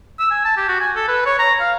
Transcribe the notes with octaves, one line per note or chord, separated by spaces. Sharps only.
E6
G#5
A5
G4
F#4
G#5
A4
B4
C#5
A#5
F5